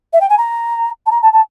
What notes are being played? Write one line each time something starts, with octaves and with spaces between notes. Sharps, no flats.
E5
G5
G#5
A#5
A5
A#5
A5
A5